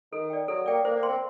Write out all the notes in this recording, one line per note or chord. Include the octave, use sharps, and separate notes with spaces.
D#3 A4
D5 G5
F#3 A4
A#3 D5 G5
A#3 C5
A#3
G5 C6
C4